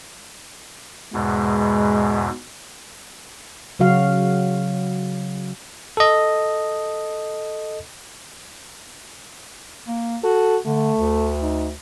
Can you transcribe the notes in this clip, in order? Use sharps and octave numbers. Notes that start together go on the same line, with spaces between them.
E2 G#2 B2 G#3
C#3 F#3 F#4 F5
A4 D#5
A#3
F#4 A4
D3 A3
D2
D#4